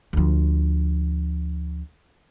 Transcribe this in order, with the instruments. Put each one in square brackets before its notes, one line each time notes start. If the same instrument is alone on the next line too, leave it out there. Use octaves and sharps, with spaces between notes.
[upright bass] D2 F3